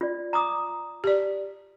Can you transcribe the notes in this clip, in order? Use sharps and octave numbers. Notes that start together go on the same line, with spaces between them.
F4 D5
A#5 D6 D#6
G4 D5